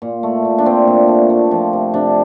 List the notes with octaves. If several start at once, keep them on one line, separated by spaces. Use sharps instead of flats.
A#2
A3
A#2
D4
A3 C4
A#2
A3
A3
F3
C3
C3 D4